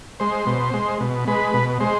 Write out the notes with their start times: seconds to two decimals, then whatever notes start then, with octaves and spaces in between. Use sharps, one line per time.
0.20 G#3 C5
0.47 B2
0.74 G#3
1.00 B2
1.27 G#3 B4
1.54 B2
1.80 G#3 C5